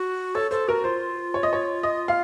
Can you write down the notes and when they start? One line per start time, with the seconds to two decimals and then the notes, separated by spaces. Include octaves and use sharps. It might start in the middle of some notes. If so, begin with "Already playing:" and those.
Already playing: F#4
0.35 A4 C#5
0.51 A4 C5
0.68 F#4 A#4
0.84 F4 C5
1.34 C#5
1.43 D#5
1.53 C#5
1.83 D#5
2.08 F5